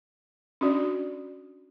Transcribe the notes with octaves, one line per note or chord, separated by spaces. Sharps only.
C#4 D4 F#4 D5